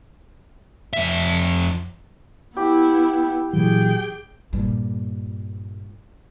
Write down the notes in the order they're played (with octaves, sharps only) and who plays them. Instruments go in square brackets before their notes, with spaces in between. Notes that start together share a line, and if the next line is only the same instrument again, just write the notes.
[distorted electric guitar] F2 E5
[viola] B3 E4 [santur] G4
[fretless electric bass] A#2 E3 F#3 [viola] G#4 G5
[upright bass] G2 A#2